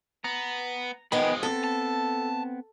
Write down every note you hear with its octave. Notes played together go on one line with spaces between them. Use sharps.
B3 A#5
D#3 F3 G#3 B3 G5 G#5 B5
B3 C4 A4
A5